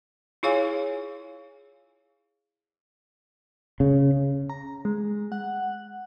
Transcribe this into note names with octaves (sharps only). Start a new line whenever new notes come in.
E4 F4 G#4 C#5 F5 G#5
C#3
A#5
G#3
F#5